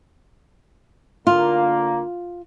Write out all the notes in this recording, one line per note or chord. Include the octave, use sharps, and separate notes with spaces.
D3 A#3 F4